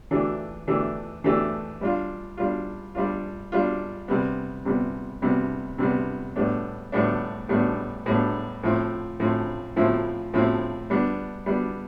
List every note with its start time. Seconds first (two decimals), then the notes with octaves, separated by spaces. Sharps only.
0.11 E3 A3 D4 G4
0.67 E3 A3 D4 G4
1.24 E3 A3 D4 G4
1.81 G3 D4 F4
2.37 G3 D4 F4
2.95 G3 D4 F4
3.52 G3 D4 F4
4.08 C3 G3 B3
4.65 C3 G3 B3
5.22 C3 G3 B3
5.78 C3 G3 B3
6.36 A2 G3 B3 D4
6.92 A2 G3 B3 D4
7.49 A2 G3 B3 D4
8.06 A2 G3 B3 D4
8.63 A2 F3 C4 E4
9.20 A2 F3 C4 E4
9.76 A2 F3 C4 E4
10.34 A2 F3 C4 E4
10.90 G3 B3 D4
11.46 G3 B3 D4